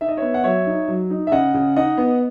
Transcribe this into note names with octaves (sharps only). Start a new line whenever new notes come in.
D#4 E5
D#5
B3 C#5 E5
F#5
F#3 C#5 E5
D#4
F#3
D#4
E5
C#3 D#5 F#5
C#3
D#4 D#5 F#5
B3